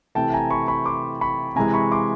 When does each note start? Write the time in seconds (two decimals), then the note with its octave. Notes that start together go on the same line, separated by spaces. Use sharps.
0.15 C3 E3 A3 G5 A5
0.34 G#5 A#5
0.51 B5 C#6
0.68 B5 C#6
0.85 C6 D6
1.21 B5 C#6
1.56 C3 E3 G#3 G#5 A#5
1.74 B5 C#6
1.91 C6 D6